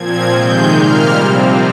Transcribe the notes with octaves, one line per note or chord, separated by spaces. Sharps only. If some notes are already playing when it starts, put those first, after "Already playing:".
Already playing: A#2 F3 C4 G#6
C3 D#3 G#3 G6
A#2 G3 A#3 F6
C3 F3 C4